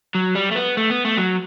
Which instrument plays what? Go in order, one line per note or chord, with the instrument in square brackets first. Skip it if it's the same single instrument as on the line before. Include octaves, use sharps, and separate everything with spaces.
[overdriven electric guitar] F#3
G3
A3
B3
A3
B3
A3
F#3